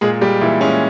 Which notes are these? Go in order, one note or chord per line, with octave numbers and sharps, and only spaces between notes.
A#2 G#3 G#4
G3 G#3 G4
A#2 E3 E4
G#3 C#4